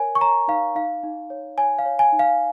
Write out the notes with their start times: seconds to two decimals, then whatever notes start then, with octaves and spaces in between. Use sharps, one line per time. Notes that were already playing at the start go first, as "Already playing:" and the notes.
Already playing: A#4 C#5 G#5
0.15 C#6
0.21 C#5 A#5
0.48 D#4 F5
0.75 D#4 F5
1.03 D#4
1.30 C#5
1.57 C#5 G#5
1.79 F5
1.85 C#5
1.99 G#5
2.12 D#4
2.19 F5